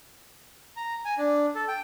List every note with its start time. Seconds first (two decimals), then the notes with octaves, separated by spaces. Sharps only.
0.76 A#5
1.05 G#5
1.18 D4
1.55 A4
1.68 G5